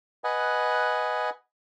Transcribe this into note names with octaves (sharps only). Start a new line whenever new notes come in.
B4 D#5 F#5 G#5